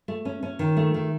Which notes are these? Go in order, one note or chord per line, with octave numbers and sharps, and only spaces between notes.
A3
C#4
C#4
D#3
A3
D#3